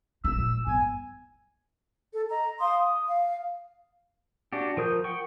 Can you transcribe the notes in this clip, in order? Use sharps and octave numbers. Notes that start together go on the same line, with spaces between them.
A3 D#4 E6
A#2 G3
G2 B3 G#5
A4
D#5 A#5
F5 C6 D#6
D#6
F5
D4 F#4 G4
F3 A#4 D#6 G6
F#5 G5 C#6